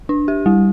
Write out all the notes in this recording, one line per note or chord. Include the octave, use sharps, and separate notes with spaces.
D4
G4
G3